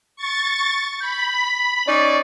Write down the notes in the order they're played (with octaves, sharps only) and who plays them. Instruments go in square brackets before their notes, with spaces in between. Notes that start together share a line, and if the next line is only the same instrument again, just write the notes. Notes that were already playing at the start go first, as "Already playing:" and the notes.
[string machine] C#6 A6
[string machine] B5 [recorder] G6
[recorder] B6
[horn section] C#4 D#4 D5 [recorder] C#6